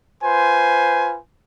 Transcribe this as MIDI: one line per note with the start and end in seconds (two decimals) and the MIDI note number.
0.24 1.18 65
0.24 1.18 71
0.24 1.18 72
0.24 1.18 80